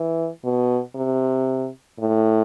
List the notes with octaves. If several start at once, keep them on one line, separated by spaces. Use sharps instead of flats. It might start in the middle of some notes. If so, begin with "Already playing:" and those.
Already playing: E3
B2
C3
A2